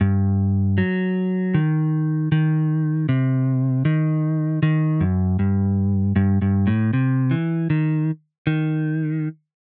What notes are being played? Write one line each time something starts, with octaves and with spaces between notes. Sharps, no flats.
G2
F#3
D#3
D#3
C3
D#3
D#3
F#2
G2
G2
G2
A2
C3
E3
D#3
D#3